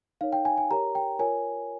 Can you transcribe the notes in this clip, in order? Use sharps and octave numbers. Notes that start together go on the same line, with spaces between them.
D#4 A#4 C#5 F5
G5
G#5
G#5
G4 A#4 C#5 A#5
G5
F4 A#4 C#5 G#5